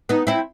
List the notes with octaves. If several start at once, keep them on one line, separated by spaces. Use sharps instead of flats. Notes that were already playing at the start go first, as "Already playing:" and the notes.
B3 D#4
C4 E4